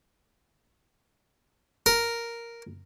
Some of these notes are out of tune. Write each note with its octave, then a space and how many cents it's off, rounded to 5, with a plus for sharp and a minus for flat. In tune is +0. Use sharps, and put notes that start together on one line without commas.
A#4 +0